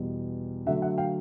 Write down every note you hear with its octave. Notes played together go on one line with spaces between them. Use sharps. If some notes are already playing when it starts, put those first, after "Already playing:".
Already playing: E2 B2 G3 B3
D3 F#3 A3 E5 F#5
E5 F#5
F5 G5